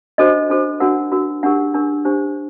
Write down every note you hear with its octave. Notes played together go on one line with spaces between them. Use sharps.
D4 F#4 A4 C5 D#5
D4 F#4 A4 C5
D4 F#4 A#4 F#5
D4 F#4 A#4
D4 G4 A#4 F#5
D4 G4 A#4
D4 G4 C5